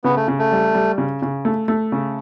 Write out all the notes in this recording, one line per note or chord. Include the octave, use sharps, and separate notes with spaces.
C#3 B3
A3
C#3
A3
G3
G3
C#3
C#3
A3
A3
C#3